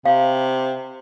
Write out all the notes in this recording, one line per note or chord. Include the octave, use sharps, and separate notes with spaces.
C3 F5